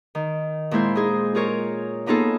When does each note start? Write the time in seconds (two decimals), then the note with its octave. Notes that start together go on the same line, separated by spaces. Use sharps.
0.15 D#3
0.71 A#2 G#3 E4 C5
0.95 D#4 G#4
1.35 F4 G#4 A#4 C#5
2.06 A#3 B3 D#4 F4 G#4 A4